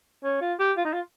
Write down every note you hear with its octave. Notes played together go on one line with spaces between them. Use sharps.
C#4
F4
G4
F4
D#4
F4